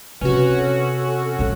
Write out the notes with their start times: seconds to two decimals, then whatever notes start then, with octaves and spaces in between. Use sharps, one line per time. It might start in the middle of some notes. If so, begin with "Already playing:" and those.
0.21 C3 C#4 F#4 B4
0.57 A4
1.39 A#2 A#3